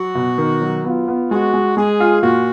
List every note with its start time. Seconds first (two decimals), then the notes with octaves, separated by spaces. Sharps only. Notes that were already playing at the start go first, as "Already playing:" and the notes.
Already playing: F#3 F#4
0.15 B2
0.38 D#3
0.62 F#3
0.84 B3 F4
1.08 B3
1.31 G#3 F#4
1.54 G#3
1.77 G#3 G#4
2.00 F4
2.22 A#2 F#4